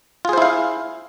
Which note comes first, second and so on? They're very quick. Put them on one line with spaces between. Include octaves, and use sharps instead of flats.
F4 G#4 C5 E4 F5